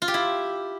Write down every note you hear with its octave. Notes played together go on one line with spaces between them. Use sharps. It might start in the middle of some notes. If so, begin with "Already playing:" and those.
F4
G4
E4